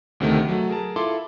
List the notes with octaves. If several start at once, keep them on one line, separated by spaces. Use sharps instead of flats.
D2 C3 D#3 A3
F#3 A3
G#4 A#4 A5
E4 F4 A4 C6 D6